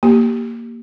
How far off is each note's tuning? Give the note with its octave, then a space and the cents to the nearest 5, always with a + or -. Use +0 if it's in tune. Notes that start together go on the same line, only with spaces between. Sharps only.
A#3 +0 G4 +0